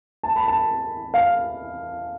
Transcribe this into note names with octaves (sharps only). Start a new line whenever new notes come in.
A5
B5
A5
F5